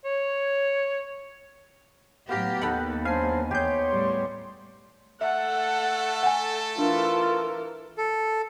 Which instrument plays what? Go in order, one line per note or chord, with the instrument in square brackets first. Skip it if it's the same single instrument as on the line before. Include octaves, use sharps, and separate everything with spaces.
[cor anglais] C#5
[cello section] A2 F#3 G4 [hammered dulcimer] B3 F5 A#5
[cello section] D#2 [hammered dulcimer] D#4 A4 B4 [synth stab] F#5 G5 B5
[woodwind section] F#3 D4 C5 [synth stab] F5 C7 [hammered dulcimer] G#5
[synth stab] E2 G6 [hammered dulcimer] G4 G#4 [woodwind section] C#5 C6
[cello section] A2 G3
[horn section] A3 A4 [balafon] E5 [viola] F#5
[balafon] F#5 G#5
[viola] E3 A#4 [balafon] D4 [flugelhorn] F4
[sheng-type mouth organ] A4